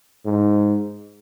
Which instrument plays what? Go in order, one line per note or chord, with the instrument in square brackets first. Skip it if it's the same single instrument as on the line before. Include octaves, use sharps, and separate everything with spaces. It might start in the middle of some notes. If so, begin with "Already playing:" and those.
[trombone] G#2